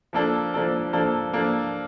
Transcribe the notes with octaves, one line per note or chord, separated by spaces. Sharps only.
F3 A#3 D4 A4
F3 A#3 D4 A4
F3 A#3 D4 A4
F3 A#3 D4 A4